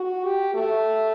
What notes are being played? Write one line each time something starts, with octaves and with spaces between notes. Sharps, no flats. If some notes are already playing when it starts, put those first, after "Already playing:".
Already playing: F#4
G4
A3